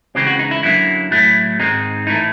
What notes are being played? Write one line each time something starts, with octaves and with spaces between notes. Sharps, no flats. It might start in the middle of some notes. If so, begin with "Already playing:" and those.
C#2 C#3 E3 G#3 C4 G4
F#4
D#4
E4
F#2 D3 F#3 A#3 E4
A2 F#3 A3
G#2 D#3 G#3 C4 D#4
A2 E3 A3 D#4